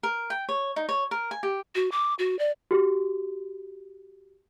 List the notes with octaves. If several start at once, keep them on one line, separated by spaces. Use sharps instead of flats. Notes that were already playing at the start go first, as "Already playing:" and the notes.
A#4
G5
C#5
D#4
C#5
A#4
G#5
G4
F#4
D6
F#4
D5
F#4 G4